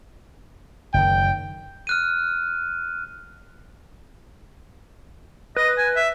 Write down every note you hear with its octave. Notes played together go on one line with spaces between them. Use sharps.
F#1 A#2 D#3 G5
F6 F#6 D#7
B4 D#5
G#5
E5